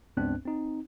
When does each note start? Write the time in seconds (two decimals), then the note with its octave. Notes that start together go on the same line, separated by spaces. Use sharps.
0.17 C#2 G2 B3 C4 D4 F#6
0.45 C4 D#4